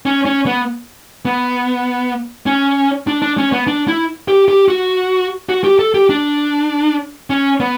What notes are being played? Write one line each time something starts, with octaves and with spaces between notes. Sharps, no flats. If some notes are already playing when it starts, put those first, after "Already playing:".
C#4
C#4
B3
B3
C#4
D4
D4
C#4
B3
D4
E4
G4
G4
F#4
F#4
G4
A4
G4
D4
C#4
B3